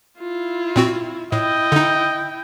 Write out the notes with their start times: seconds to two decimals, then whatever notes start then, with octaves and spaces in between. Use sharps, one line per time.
0.18 E4 F4
0.76 A#2 C4 F#4
1.32 A2 E4 D#5 G5
1.72 D3 D#4